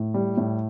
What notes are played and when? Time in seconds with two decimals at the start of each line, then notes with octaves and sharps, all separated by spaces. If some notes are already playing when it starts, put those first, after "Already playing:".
Already playing: A2
0.14 G3
0.37 A2